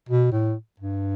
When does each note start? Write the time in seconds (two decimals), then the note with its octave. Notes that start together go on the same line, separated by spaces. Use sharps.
0.09 B2
0.32 A2
0.80 G2